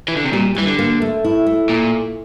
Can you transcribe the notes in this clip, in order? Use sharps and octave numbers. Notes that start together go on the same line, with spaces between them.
E3
D3
C3
A#2 G3
E3 G3
D3
A#3
A3
E4
A3
A#2